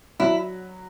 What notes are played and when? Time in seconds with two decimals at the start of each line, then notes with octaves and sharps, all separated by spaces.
0.19 F#3 E4